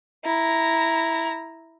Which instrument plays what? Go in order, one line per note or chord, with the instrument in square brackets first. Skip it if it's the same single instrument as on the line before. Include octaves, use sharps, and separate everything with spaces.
[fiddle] E4 A#5